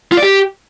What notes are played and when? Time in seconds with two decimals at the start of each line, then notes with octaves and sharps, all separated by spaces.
0.12 F4
0.17 D5
0.23 G4